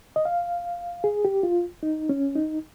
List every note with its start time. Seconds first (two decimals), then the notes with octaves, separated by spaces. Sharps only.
0.16 D#5
0.25 F5
1.04 G#4
1.25 G4
1.43 F4
1.83 D#4
2.09 C#4
2.35 D#4